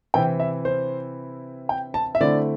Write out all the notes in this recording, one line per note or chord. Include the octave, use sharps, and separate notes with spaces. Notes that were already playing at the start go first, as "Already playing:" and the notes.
C3 E3 C4 E4 G5
E5
C5
G5
A5
E5
D3 A3 C4 E4 D5